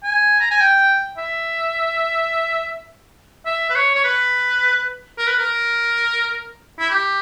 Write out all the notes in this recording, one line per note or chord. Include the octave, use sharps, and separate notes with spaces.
G#5
A#5
G#5
G5
E5
E5
B4
C#5
C#5
B4
A#4
B4
A#4
E4
G4